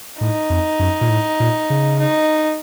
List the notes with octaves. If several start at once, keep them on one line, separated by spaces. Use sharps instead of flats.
A2 D#4
F2
F#2
A#2
A2
A#2
C#3
D#4